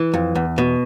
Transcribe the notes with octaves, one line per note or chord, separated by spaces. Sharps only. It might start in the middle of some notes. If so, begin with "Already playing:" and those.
Already playing: E3
F2
E2
B2